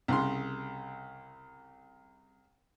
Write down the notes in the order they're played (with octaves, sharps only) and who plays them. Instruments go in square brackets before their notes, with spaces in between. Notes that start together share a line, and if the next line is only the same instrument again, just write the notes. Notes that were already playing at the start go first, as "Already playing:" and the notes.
[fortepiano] C2 C#3 C6